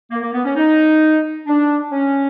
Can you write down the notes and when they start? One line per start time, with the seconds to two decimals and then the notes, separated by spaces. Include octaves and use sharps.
0.11 A#3
0.22 A#3
0.33 B3
0.44 C#4
0.56 D#4
1.47 D4
1.91 C#4